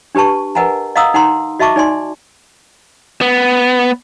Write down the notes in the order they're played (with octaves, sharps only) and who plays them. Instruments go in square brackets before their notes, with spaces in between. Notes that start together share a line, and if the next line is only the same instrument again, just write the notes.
[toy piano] D4 G4 B4 A5 C#6
A#4 B4 D#5 F#5 G#5 A#5
D#5 F5 F#5 A#5 D#6 E6
D#4 F#5 A#5 C6
F#4 D#5 E5 A5 C#6 D6
D#4 D5 G#5 C6
[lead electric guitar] B3